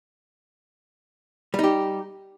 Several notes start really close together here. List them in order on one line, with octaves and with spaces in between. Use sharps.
G3 D#4 G4